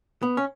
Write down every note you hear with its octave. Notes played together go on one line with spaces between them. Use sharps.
B3
C#4